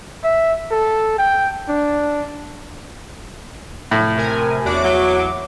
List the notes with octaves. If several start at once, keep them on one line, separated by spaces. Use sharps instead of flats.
E5
A4
G5
D4
F1 A2 C#6
C3 A#4 G#5 F#6
E2 D4 F#4 C#5 E5 A#5 D6
F#3